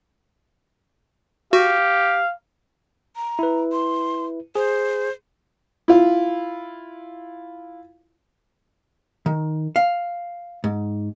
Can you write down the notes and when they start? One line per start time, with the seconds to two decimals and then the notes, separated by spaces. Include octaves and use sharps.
1.53 F#4 G4 F5
3.16 A#5
3.39 E4 B4
3.72 C6
4.55 G#4 C5
5.88 E4 F4
9.26 D#3
9.76 F5
10.64 G#2